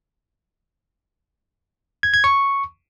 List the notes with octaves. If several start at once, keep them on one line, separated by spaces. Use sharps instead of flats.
G#6
G#6
C#6